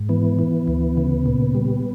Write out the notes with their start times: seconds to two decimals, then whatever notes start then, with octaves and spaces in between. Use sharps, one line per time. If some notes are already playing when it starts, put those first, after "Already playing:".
Already playing: G#2
0.09 E3 B3
0.39 E3
0.68 D2
0.97 C#3
1.26 A#2
1.55 G3